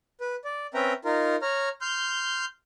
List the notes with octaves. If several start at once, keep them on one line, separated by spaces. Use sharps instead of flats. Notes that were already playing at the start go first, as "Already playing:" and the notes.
B4
D5
C4 C#4 B4 E5 G5 A#5
D#4 F4 A#4
C#5 A#5 F6
C6 F6 G6